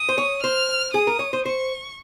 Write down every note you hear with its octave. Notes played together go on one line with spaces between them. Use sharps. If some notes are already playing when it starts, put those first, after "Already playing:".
Already playing: D#6
C5
C#5
C5 F6
G#4 D#6
A#4
C#5
C5
C5 C#6